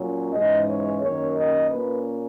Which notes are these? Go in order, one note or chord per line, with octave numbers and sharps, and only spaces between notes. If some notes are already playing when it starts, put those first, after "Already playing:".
Already playing: A#2 F#3 C#4
G#2 E3 G#3 C#4 D#5
C#5
F#2 D#3 A#3 C#4 C#5
D#5
A#2 A#3 C#4 B4